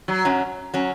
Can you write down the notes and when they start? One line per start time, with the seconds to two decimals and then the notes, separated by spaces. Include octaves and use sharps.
0.08 F#3
0.25 F#2 F#3 C#4
0.74 F#3 C#4